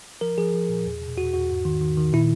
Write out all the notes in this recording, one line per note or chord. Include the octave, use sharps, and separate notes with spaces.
F3 A#4
F3 G#4
F3
A#2
E2
B2
E2 F#4
E2 F#4
G#2
D#3
D#3
D#3
A#2 E4